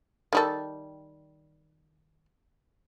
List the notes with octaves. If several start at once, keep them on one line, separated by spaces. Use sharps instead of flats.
D#3 G3 A4